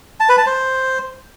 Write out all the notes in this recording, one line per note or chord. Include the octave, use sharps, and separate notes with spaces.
A5
B4
A5
C5